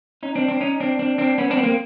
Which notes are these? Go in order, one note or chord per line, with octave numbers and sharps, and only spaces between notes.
C#4 D#4
C4 D4
C4 D4
C#4 D#4
C4 D4
C4 D4
C4 D4
B3 C#4
C4 D4
B3
A#3 C4